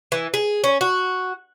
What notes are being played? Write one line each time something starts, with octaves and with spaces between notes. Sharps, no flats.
E3
G#4
C#4
F#4